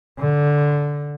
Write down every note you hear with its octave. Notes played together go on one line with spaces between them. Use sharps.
D3